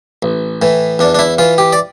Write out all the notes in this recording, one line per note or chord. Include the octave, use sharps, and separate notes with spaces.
A1
A2 E3
E2 D4
D4
E4
E3 F4
G4
D5